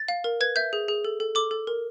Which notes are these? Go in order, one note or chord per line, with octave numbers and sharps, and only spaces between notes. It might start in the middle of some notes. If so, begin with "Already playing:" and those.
Already playing: A6
F5
A#4
B4 G#6
E5 G6
G#4
G#4
A4
A4
A4 D6
A4
A#4